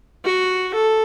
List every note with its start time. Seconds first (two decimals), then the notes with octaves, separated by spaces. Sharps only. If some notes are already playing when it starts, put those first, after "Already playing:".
0.24 F#4
0.74 A4